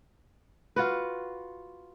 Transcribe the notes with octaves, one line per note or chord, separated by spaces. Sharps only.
F4 F#4 B4